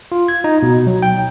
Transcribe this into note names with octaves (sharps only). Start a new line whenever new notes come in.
F4
G#6
D#4
B2
F#3
G5